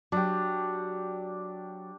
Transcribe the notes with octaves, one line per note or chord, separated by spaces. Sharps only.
F#3 D4 G4